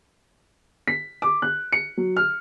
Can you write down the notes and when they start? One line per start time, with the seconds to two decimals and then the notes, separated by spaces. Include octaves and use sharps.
0.87 B6
1.22 D6
1.42 F#6
1.72 C#7
1.97 F#3
2.17 F6